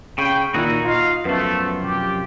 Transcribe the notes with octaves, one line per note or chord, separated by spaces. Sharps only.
C#3 G5 B5 C#6
A#2 D#3 D#4 E4 F#4
F4 D#5 F5
F#2 F3 A3 B3
C3 G4